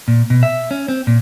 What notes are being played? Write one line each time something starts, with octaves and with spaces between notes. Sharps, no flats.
A#2
B2
E5
C#4
C4
A#2